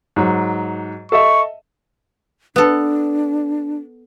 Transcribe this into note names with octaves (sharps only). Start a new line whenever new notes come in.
G#2 F#3
A4 D#5 E5 C#6
B3 D4 A4